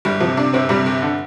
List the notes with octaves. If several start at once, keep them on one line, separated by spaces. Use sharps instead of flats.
G1 G3
C3 F3
C3 D4
G1 C4
C3 G3
G1
D3